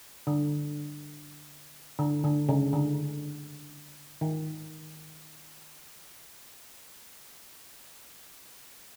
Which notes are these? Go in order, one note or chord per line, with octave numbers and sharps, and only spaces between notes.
D3
D3
D3
C#3
D3
D#3